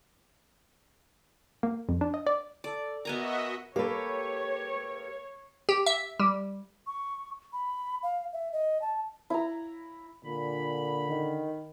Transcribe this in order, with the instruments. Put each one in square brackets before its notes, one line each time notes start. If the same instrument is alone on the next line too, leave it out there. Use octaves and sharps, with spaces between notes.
[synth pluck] A#3
F2
D4
D#5
D5
[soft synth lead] A4 [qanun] D5
[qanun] B3 G#5 A#5 [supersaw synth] F#4 D#5 E5 [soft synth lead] A#4
[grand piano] A#3 A4 [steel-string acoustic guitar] G4 B4 [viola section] C#5
[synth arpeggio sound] G4
E5
G3
[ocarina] C#6
B5
F5
E5
D#5
A5
[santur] E4 A#5
[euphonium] A#2 [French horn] D3 [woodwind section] B5
[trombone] D#3